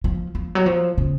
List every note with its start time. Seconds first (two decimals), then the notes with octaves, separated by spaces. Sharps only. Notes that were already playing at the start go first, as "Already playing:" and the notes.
0.04 F3
0.35 F3
0.55 F#3
0.66 F3
0.98 C#3